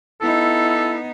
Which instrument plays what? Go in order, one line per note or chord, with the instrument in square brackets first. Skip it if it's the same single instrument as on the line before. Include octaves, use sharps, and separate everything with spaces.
[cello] B3 D#4 [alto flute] E4 [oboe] A4